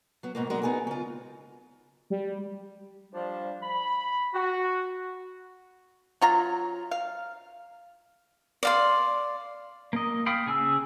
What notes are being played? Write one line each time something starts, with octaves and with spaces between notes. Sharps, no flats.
F#3 B3
G#2 B2 A#3
F#3 G#3 D4 F#4 A#4
B3 D#4 G#4 A#4
C#3 F4
G3
F3 G3 D4
B5
F#4
F#3 F4 A#5
F5
D5 F5 C6
A#3 D#5
F5 G5 B5 D#6
C#3 G#4 G#5 E6